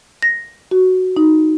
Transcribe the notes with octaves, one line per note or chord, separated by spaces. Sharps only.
A#6
F#4
D#4